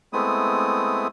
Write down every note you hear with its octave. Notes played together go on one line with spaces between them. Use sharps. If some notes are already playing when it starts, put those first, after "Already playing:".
G#3 A3 B3 C4 E4 D#6